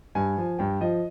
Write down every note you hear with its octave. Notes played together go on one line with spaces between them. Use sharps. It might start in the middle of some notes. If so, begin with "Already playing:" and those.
G2 G#5
F3
G2 G5
F3 D#5